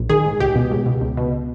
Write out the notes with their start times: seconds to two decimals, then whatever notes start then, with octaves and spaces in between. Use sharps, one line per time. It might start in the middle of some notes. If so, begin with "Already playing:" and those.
Already playing: A#1
0.09 D#3 G#4
0.25 G#2
0.40 C#2 G4
0.55 B2
0.71 C#2
0.86 B2
1.01 C#2
1.17 B2